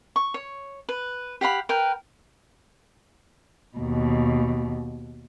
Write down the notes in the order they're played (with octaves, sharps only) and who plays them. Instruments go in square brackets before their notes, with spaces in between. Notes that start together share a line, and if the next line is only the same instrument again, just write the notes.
[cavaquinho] C#6
C#5
B4
G4 F5 F#5 B5
A#4 B4 G5
[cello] D#2 B2